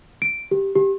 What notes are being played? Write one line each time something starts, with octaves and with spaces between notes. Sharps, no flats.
D7
G4
G4